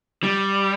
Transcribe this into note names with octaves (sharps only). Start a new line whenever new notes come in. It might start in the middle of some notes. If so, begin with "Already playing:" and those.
G3